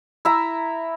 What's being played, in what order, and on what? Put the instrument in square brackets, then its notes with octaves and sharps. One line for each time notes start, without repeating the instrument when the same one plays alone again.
[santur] E4 E5 A#5